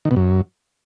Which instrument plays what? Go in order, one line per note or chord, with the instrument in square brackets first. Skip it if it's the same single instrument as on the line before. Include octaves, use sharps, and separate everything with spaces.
[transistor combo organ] D#3
B2
F#2